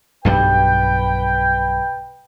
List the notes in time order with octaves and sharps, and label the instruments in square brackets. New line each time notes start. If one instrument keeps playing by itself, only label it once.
[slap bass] B1 G2 G3 [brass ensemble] B4 G5